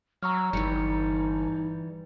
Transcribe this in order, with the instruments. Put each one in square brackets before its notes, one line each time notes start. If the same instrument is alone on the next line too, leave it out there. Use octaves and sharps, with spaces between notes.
[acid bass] F#3 [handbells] A#5 C#6 F6 [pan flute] E6
[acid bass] G1 [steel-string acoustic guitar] E3 G3 [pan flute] D#4 [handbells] C#7